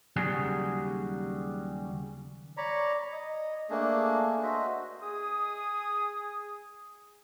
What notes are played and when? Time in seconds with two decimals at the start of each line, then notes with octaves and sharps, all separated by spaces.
0.16 D#2 C#3 F#3 G3 F#4 G#4
2.57 C#5 D5 A#5 B5
3.13 D#5
3.70 A3 A#3 D4 G#4
4.43 F#4 C5 D#5 E5
5.03 G#4 D#6